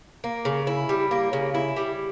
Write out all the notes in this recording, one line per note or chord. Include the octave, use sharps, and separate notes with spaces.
A#3
C#3
E4
G3
A#3
C#3
E4
G3